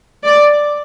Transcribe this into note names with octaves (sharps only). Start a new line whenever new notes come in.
D5